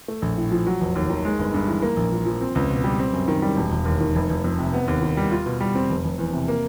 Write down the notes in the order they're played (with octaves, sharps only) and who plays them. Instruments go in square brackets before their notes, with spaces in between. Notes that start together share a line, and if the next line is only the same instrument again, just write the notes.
[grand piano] A3
A#1
A2
F3
F#3
F1
D#2
D#3
G#3
G1
G2
E3
A#3
A#1
A#2
F3
C4
C#2
B2
G3
C4
F#2
D#3
G3
E1
E1
D#2
D#3
F1
F1
F2
C3
B3
D#2
D#3
G3
F4
B2
G3
C4
F1
F1
E2
C3
A#3